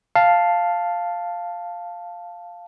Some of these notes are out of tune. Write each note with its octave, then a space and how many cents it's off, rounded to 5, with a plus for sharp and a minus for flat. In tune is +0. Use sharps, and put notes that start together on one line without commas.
F5 +0 A5 +0